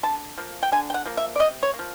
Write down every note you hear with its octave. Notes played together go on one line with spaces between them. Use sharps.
D3 A5
F3 A#3
G5
D3 G#5
G5
F#5
F3 A#3
E5
D5
C3 D#5
C#5
A#3
F3